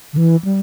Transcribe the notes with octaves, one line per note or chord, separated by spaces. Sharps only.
D3
E3
G3